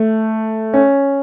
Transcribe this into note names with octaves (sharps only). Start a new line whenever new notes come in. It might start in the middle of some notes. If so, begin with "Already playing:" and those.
Already playing: A3
C#4